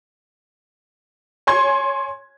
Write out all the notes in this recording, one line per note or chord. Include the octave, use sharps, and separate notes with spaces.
C#5 G#5 C6 G#6